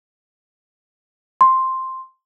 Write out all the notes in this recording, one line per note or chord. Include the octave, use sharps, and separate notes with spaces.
C6